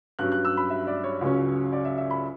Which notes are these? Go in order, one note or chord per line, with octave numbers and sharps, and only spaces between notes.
G2 F#3 C#4 F#6
F#6
E6
B5
E5
D5
C#5
C#2 C#3 F#3 C#4
D5
E5
E5
B5